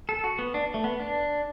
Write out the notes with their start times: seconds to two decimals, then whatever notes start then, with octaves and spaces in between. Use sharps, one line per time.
0.09 A4
0.24 F#4
0.39 B3
0.54 D4
0.74 A3
0.84 B3
1.00 D4